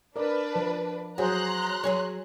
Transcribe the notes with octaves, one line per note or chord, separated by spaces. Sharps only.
D4 A#4 B4 D5
F3
F#3 F#4 G#4 C5 A#5 C6 F#6
F#3 G#4 C#5